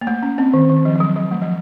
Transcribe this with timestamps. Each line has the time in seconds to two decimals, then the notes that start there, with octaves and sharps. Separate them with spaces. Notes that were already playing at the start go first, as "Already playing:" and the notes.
0.01 A#3
0.07 A3
0.23 C#4
0.38 C4
0.53 D#3
0.69 D#3
0.85 F3
0.96 F3
1.00 F#3
1.16 F#3
1.31 A3
1.42 F3